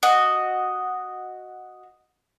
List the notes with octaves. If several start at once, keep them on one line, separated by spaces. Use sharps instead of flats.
F#4 D#5